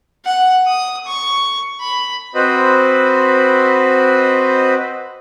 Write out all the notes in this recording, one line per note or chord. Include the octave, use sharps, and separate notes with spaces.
F#5
D#6
C#6
B5
C4 F#4 B4 C5 D#5 B5